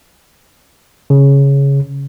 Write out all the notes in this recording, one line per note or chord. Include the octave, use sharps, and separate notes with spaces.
C#3